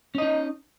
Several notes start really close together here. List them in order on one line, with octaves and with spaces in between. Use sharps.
C#4 D#5 D#4